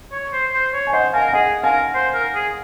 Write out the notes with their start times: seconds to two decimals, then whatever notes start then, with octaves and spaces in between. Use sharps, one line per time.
0.12 C#5
0.33 C5
0.53 C5
0.73 C#5
0.87 G#5
0.93 C5 D#5 F#5
1.13 A#4 F5 G#5
1.33 G#4 D#5 F#5
1.63 A#4 F5 G#5
1.94 C5
2.14 A#4
2.35 G#4